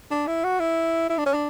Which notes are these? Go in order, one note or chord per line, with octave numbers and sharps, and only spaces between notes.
D4
E4
F#4
E4
E4
D4
C#4
D4